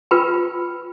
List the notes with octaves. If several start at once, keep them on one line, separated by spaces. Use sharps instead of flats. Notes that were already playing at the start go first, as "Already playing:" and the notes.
F4 A#4 B4 G5